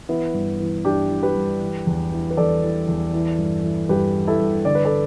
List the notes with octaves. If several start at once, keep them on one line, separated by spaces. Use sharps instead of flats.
E3 B3 E4
G2
E3
G2 D4 G4
E3
G4 B4
G2
E3
E2
E3
B4
E2 A4 D5
E3
E2
E3
G2
E3
G2 G4 B4
E3
E4 A4
G2
D3 D5
B4
A4 D5